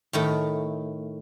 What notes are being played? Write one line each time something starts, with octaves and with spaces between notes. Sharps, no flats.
A2 D#3 A3